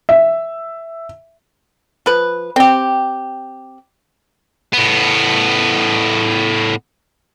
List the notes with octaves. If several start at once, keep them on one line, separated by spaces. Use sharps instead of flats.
E5
F3 B4
C4 G4
A2 B3